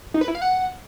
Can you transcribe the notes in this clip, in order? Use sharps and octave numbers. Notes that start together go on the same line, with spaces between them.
D#4
B4
E4
F5
F#5